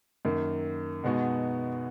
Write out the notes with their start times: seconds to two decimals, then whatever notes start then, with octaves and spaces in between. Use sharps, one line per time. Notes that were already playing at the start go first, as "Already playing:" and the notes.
0.25 F#2 D#3 A#3
1.04 B2 G#3 B3 D#4 F#4